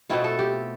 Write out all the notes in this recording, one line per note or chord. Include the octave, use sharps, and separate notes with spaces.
B2 A3 C4 E4 F4
A4
G4